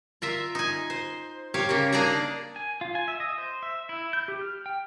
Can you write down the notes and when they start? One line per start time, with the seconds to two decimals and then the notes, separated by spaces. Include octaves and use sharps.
0.22 F4 A#4 E5
0.55 D#4 G#5
0.90 C5
1.54 G4 C#5 F5
1.69 C#3 A#3
1.92 A#3 D4 D#4 G#4 D5 A#5
2.56 G#5
2.81 F4
2.95 G#5
3.08 E5
3.20 D#5
3.38 C5
3.63 E5
3.89 E4
4.13 G6
4.28 G4
4.41 F6
4.66 G5